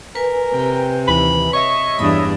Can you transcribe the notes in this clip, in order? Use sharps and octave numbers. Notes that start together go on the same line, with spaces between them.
A#4 B4 G#5
C3 G5
D#2 E3 B5
C#5 D#5 E5 C#6
E2 G2 D4 A5 B5 D#6